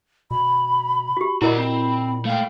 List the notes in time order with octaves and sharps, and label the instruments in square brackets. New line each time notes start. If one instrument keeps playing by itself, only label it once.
[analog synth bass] B2 [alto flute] B5
[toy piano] F#4 G4
[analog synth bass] A#2 [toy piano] E4 A#4 D#5 [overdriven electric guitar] F#4 D5
[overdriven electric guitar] C4 [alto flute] B5
[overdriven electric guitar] A3 G5 [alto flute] F5